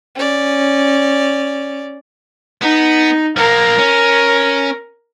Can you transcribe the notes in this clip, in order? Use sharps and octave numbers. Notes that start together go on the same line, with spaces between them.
C#4 D5
B3 D#4
F3 A#3 A#4
C#4